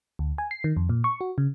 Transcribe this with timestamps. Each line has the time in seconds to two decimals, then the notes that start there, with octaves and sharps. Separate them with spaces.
0.19 D2
0.38 G#5
0.51 C7
0.64 D#3
0.77 F2
0.89 A#2
1.04 C#6
1.21 F#4
1.38 C#3